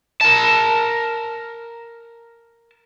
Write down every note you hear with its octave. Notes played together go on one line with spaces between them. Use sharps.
A#4 A5